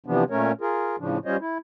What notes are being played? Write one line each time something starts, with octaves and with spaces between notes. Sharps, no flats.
C3 E3 F3 B3 D4
A#2 A3 C#4 A#4 C#5
F4 G#4 A#4
A2 C#3 F3 D4
G3 C#4 F4 C5 C#5 D#5
E4